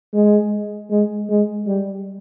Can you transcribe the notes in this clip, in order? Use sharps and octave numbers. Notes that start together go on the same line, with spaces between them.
G#3
G#3
G#3
G3